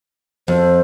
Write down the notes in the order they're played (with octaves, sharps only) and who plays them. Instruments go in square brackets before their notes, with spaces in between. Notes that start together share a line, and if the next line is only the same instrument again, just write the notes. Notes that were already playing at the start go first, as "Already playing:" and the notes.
[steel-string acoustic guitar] F2 [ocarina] C5